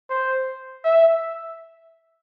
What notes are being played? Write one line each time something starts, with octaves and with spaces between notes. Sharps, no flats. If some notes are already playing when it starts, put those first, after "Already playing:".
C5
E5